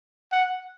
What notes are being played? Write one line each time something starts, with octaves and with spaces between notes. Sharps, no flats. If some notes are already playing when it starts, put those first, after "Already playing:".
F#5